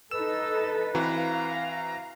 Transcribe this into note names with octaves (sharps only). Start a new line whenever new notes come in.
D#4 A4 B4 E6 E7
E3 C4 F#4 F5 A#5